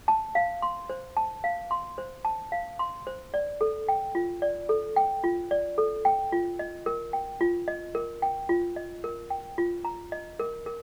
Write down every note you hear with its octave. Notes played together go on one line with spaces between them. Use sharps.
A5
F5
C6
C5
A5
F5
C6
C5
A5
F5
C6
C5
D5
A4
G5
F4
D5
A4
G5
F4
D5
A4
G5
F4
D#5
A#4
G5
F4
D#5
A#4
G5
F4
D#5
A#4
G5
F4
A#5
D#5
A#4
A#4